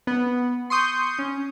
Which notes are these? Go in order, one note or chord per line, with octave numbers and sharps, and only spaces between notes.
B3
C6 C#6 D#6 G6
C#4